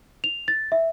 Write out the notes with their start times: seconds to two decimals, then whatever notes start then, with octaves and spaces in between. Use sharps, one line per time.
0.24 F7
0.48 A6
0.72 E5